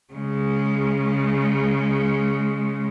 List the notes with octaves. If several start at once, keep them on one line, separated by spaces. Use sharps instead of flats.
C#3 G#3